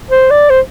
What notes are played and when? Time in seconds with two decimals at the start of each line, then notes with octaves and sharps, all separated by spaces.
0.11 C5
0.30 D5
0.50 C5